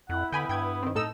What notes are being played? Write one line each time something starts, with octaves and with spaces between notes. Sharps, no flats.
F2 E4 F#5
D3 B3 G5 G#5 B5
G2 B3 G5 G#6
D#3 C4
A2 D#4 A4 E6